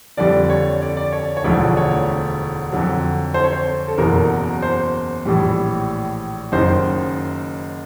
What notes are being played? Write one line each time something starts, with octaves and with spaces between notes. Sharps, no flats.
F2 D3 G3 D5
C#5
D5
D5
C#5
C#5
E1 D2 D3 F3 D5
C#5
F2 D3 F#3
C5
C#5
C5
A4
F#1 E2 B2 F#3 A#4
C5
A#1 A2 E3 G3
F#1 F#2 D#3 C5